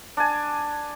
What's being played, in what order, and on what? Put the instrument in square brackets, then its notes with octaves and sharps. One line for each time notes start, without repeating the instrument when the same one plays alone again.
[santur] D4 G#5